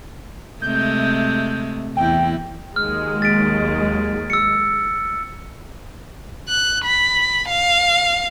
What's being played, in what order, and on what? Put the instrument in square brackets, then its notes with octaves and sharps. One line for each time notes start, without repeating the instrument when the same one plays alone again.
[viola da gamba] C3 G#3 A3 [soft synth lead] G6
[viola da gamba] E2 E4 [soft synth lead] G5
[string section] D#2 F#3 G#3 [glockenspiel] F6
[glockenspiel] A6 B6 D7
E6 C#7
[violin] F#6
B5
F5